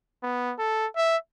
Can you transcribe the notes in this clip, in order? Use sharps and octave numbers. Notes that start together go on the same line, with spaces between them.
B3
A4
E5